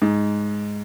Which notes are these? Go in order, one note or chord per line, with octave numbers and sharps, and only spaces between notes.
G#2